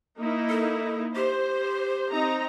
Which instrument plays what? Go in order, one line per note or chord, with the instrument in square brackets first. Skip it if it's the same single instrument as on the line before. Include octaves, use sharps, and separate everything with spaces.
[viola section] A#3 D#4 E4
[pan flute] A4
[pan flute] G4 [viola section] C5
[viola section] C4 D#4 A#5